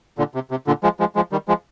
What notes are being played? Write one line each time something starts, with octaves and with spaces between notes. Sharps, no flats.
A#2 D3
C3
C3
A#2 D3
F3 G#3
F3 G#3
F3 G#3
D#3 G3
F3 G#3